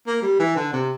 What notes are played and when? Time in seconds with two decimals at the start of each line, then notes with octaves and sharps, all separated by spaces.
0.06 A#3
0.22 G3
0.39 E3
0.56 D3
0.73 C3